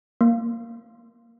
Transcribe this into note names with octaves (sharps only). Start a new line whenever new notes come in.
A#3